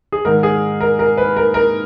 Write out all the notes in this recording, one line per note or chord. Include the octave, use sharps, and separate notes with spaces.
G#4
G#2 D#3 A#4
G#4
A#4
A#4
B4
A#4
A#4